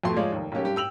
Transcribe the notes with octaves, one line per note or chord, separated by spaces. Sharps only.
F2 B2 A3 C6
F3 G#3 F4 C#5 D5
F1 D#2
B1 A#3 C#4 G4
G2 G4
G5 E6 F7 F#7